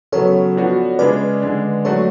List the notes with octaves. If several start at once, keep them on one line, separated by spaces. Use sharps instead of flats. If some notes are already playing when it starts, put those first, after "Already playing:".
C#3 F#3 B3 A4 C#5
F3 B3 D4 F#4
C#3 G#3 D4 B4 D5
D3 G#3 D4
F#3 A3 D4 F#4 A4 C#5